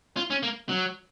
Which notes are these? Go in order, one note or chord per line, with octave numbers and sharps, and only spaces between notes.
F4
C#4
A#3
F#3